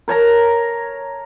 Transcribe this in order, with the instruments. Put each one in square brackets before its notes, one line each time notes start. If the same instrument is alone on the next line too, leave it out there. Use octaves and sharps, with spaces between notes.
[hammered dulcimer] A#4 C#5 A5 A#5